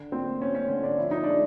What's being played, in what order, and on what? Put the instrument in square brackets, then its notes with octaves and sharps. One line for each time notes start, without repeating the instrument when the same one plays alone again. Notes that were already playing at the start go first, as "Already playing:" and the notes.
Already playing: [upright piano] D3
A#3 C4
A#3 C#4
C#4
D3 C#4
D4
F3 E4
D#4
G#3 D4